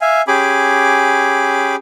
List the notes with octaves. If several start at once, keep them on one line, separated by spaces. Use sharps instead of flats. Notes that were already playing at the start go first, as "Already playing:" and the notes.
E5 F5 G#5
C#4 G4 G#4 G#5 B5 D6